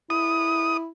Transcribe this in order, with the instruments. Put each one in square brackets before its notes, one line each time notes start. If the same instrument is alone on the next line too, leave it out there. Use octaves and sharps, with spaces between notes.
[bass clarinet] E4 [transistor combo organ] D#6